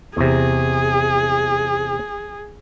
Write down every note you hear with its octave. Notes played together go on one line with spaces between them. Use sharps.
E2 C3 G#4